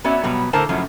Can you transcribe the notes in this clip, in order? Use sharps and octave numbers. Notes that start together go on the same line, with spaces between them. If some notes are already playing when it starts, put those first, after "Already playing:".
B3 C#4 F#4 C#5 D5 E5
B2 F#3 G3 B3
A2 D3 A#4 C5 A5
F#2 A2 C#3 F3 F#3